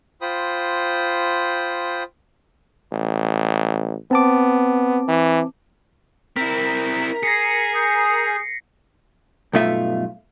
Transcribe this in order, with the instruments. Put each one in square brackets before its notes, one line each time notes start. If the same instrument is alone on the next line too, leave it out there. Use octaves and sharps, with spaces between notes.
[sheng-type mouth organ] F4 C5 G5 B5 D#6
[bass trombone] A1
[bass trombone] B3 [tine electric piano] C4 A5 D6
[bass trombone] E3
[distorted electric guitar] C4 E4 [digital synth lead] A#4 [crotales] B6
[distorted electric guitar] G#4 [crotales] A#6 C7 C#7
[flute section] G#5 D#6 G6
[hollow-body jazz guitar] B1 G2 A3 F4 E5